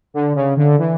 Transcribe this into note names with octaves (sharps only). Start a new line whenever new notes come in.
D3
C#3
D3
E3